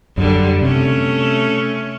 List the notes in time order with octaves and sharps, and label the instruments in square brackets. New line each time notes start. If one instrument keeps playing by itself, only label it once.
[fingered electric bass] F#2 [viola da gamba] D3 G3
[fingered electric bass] C3 [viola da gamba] A3 C#4